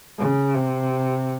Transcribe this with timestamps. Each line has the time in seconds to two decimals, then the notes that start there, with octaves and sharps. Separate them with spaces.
0.18 C#3
0.55 C3